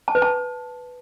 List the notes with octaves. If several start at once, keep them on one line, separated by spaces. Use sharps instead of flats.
A5
B4
A5